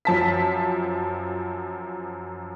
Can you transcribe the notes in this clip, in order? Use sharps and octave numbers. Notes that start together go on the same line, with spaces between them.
F#2 F3 A5 B6